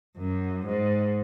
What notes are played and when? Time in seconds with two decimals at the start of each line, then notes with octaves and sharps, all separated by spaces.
0.18 F#2
0.66 G#2